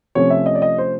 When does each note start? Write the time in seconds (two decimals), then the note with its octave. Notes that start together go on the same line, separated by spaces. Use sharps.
0.15 C3 F3 A3 C#4 C#5
0.30 E5
0.46 D#5
0.55 D5
0.62 D#5
0.78 C5